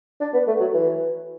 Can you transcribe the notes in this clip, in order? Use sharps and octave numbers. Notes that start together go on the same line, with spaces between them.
D4
B3
A3
F#3
E3